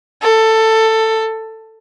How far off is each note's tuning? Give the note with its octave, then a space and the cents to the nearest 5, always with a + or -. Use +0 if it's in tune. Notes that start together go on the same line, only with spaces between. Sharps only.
A4 +15